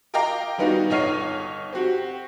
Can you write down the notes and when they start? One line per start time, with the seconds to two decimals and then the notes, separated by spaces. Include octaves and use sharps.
0.14 A#4 D#5 F5 G5 A#5 D6
0.58 D#3 G3 B3 D#4 F4 F#4
0.90 G1 D#4 C#5 F6 C7 D#7
1.73 C4 F#4 G4